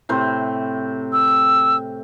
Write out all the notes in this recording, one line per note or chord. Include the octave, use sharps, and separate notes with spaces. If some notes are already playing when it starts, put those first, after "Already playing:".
A2 C3 C5
E6